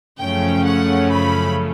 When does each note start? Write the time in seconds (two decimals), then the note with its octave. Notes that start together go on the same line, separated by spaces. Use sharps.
0.19 F#2 C#3 F3 A3 C#4 G5
0.66 F#5
1.11 B5